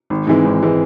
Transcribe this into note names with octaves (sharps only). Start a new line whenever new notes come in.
G#1
G#2 E3 G#3 C4
G#1
E3 G#3 C4